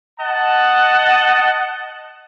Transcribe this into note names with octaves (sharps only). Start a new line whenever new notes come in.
D#5 F#5 A5